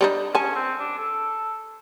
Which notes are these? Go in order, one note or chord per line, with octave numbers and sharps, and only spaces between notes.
G3 D4 D#4
C#4 G#5 A5
C4
D4
A4